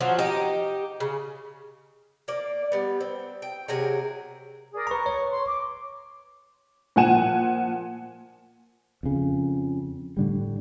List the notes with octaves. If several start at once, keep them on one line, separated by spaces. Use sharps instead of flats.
F3 F#3 F#4
D#4 G4
C#3
A#3 D5
G3 B3
C4
G5
C3 F#3 G#4 A#4
G#4 A#4 D5
B4 A#5 C#6
C#5
C6
D6
A#2 F3 F#5 G#5 E7
F2 C#3
A2 D3 G3